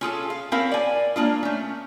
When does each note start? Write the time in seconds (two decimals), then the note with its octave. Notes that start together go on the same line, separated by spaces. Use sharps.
0.01 C#4 F4 G#4 A4
0.30 F5
0.52 C4 C#4 E4 A#4 F5
0.72 D5 G#5
1.16 G#3 A#3 D4 F4
1.43 A3 C#4